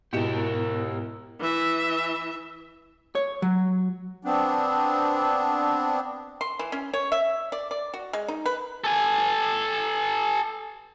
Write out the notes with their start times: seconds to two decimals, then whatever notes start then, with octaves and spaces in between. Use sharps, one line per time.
0.13 G#2 B2 B3 E4 G4 A#4 C#7 E7
1.40 E3 E5
3.15 C#5
3.42 F#3
4.25 B3 C4 D4
6.41 C6
6.59 E3
6.72 C#4
6.94 C#5
7.12 E5
7.52 D5
7.71 D5
7.94 F#4
8.13 G#3
8.28 D#4
8.46 B4
8.84 A4 G#5